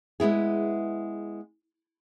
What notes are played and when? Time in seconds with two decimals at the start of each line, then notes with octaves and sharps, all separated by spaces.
0.20 G#3 B3 E4 G#4